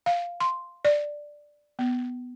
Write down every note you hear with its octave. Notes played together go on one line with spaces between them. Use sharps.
F5
C6
D5
B3